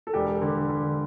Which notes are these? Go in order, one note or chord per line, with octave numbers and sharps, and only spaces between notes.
A4
E1 G4
D3
D3